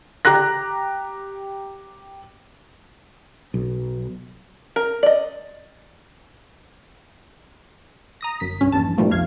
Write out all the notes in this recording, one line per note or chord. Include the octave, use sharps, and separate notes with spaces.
G4 A#5 F#6 A#6
B1
A#4
D5 D#5
A#5 D#6 A#6
G1 F#2 B6
C2 G2 C#4
A#1 E2 G2 A5
G#2 B2 F3 G3 A3 A#3
B1 F2 F5 G#6